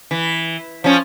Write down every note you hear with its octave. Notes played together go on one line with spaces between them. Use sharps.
E3
F3 C#4